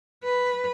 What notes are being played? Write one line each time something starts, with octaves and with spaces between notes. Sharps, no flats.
B4